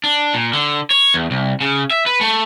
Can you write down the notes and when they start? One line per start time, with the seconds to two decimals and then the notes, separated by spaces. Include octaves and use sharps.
0.04 D4
0.34 A#2
0.54 D3
0.91 C#5
1.14 E2
1.31 C2
1.61 C#3
1.91 E5
2.06 B4
2.21 A3